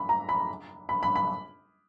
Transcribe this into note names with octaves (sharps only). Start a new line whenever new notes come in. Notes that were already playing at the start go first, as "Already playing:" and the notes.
Already playing: B5
A#5
B5
B5
B5
B5